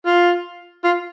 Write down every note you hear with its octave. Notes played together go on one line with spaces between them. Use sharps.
F4
F4